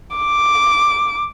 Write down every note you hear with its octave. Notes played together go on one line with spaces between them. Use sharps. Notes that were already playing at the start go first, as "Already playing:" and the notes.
D6